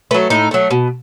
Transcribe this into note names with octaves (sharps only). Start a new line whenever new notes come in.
F#3 A3 B4
A2 D#4
F#3 A3
B2